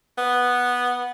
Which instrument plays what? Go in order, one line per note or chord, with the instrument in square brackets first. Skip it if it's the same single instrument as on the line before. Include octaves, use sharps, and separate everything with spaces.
[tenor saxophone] B3